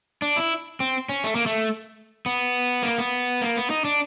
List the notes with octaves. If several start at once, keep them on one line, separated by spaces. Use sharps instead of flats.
D4
E4
C4
C#4
A3
A#3
A3
B3
A#3
B3
A#3
B3
D#4
D4